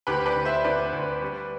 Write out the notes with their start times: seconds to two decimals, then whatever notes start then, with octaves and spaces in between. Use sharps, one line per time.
0.07 D2 G4 B4
0.26 B4 D5
0.36 D2
0.45 C5 E5
0.64 D2 B4 D5
0.93 D2
1.22 G3